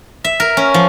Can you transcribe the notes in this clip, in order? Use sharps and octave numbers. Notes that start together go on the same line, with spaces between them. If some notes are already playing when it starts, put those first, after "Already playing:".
E5
A#4
C#4
F3